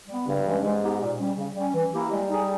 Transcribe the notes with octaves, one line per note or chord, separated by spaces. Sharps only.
G3 B3
G2 C#3
E3 G#3 C#4
G#2 G#3
B3 D#4 G4
A#2
G3 C#4
C#3
G3 C#4
E3
A#3 E4 G4
G3 G#3
D#4 G#4